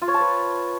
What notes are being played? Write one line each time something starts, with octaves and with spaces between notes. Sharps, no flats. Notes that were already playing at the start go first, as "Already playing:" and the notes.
F4
C#5
A5
B4